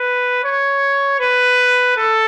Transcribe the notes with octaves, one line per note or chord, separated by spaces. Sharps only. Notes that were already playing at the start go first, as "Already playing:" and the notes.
Already playing: B4
C#5
B4
A4